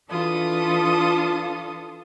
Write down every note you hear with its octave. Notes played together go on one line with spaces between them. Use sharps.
E3 D4 F4 A4 D#6